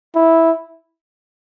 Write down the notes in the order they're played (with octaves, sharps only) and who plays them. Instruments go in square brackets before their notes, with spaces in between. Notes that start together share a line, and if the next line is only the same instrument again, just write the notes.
[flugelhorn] E4